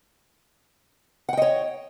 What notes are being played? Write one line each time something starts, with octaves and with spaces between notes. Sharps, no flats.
C#5 D#5 F#5 G5